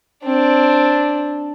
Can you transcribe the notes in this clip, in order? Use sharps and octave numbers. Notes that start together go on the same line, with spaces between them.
C4 D4